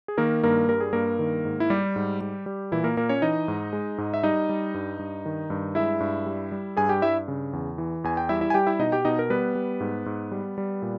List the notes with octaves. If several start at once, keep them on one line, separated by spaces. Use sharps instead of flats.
G#4
D#3 A#3 A#4
G2 A#3 A#4
G3 A#4
G#4
G2 A#3 A#4
D#3
G#2
E4
G3 G4
G#2
G3
G3
A#2 E3 E4
A#3 A#4
A#2 A#3 A#4
C#4 C#5
E3 D#4 D#5
G#2
G#3
G#2
E5
G3 D#4 D#5
G3
G2
G2
D#3
G2
G#3 E4 E5
G2
G3
G3
G2 G#4 G#5
G4 G5
G2 E4 E5
C#3
E2
E3
E2 G#5
G5
G3 E4 E5
E4 E5
G#5
G3 G4 G5
E4 E5
B2 D#4 D#5
G4 G5
B2 D#4 D#5
A#4
G3 B3 B4
G3
G#2
G#2
G3
G3
A#2